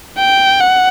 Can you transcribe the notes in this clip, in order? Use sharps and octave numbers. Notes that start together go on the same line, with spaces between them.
G5
F#5